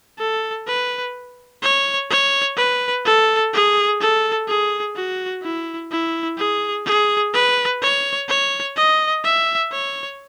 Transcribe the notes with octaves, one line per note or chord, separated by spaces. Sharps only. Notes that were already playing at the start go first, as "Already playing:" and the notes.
A4
B4
C#5
C#5
B4
A4
G#4
A4
G#4
F#4
E4
E4
G#4
G#4
B4
C#5
C#5
D#5
E5
C#5